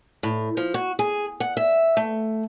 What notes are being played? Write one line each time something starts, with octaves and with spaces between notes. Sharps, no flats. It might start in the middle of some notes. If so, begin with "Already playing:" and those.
A2
F3
F#4
G#4
F#5
E5
A3